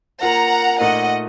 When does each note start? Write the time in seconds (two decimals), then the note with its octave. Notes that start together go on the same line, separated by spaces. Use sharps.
0.22 A#3 F4 A#4 F#5 A#5
0.80 A#2 A3 D#4 A#4 D#5 F#5